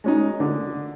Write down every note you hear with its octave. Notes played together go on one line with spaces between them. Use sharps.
G#3 C#4 D#4
D3